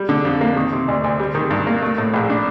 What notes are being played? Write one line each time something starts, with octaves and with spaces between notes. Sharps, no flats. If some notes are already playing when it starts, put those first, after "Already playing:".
Already playing: G3
D3
F2
A#3
D#3
C3
D2
D2
G3
D#3
G2
A#3
A3
A2
A#1
D4